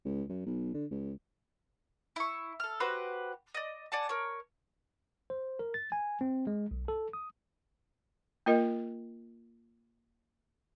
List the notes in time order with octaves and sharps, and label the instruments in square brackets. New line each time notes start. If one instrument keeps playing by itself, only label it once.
[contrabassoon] C#2
F#2
B1
D3
C#2
[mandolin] E4 C#6
A4 F6
F#4 G4 B4 C5
D5 D#5
D5 F#5 G#5 A5
A#4 C#5
[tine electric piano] C5
A#4
A6
G#5
C4
G#3
B1
A4
D#6
[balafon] A#3 F4 A#4 D#5